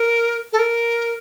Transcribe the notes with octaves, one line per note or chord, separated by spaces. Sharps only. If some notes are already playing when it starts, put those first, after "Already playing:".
Already playing: A#4
A4
A#4